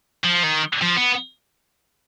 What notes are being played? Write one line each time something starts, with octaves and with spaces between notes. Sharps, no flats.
F3
D#3
F3
B3